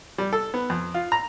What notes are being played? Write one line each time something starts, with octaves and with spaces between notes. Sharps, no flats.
G3
A4
B3
F2
F4
A#5